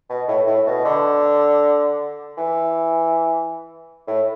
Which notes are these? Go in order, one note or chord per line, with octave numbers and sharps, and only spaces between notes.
B2
A2
A2
B2
D3
E3
A2